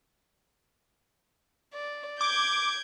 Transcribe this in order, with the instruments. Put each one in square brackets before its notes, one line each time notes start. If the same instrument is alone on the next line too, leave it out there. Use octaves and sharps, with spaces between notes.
[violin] D5
[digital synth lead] D6 [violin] G6 G#6